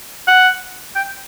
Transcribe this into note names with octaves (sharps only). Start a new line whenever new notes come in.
F#5
G5